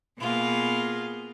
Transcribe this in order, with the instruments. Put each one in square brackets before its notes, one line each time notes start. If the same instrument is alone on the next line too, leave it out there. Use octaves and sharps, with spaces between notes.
[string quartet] B2 A#3 B3 F4 G#4